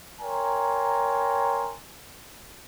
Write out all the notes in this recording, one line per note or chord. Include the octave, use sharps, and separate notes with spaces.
A#4 C#5 G5 G#5 A#5 C6